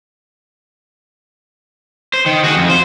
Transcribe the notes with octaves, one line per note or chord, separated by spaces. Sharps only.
C5
D#3
F#4 G#4
F2
C5